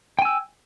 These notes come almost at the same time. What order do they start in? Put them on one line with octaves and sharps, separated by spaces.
G5 G#5 E6